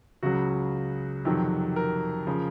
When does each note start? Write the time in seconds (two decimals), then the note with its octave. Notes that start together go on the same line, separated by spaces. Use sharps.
0.23 C#2 C#3 F#3 F#4
1.25 F2 C3 D#3 F#3
1.76 A#4
2.27 C#3 F3